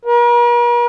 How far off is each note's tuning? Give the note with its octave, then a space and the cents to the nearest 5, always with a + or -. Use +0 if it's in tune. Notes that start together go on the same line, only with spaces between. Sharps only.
A#4 +45